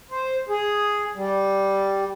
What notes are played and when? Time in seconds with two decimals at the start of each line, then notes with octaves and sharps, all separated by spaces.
0.11 C5
0.49 G#4
1.15 G3